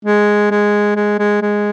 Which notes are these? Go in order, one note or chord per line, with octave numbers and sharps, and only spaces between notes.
G#3
G#3
G#3
G#3
G#3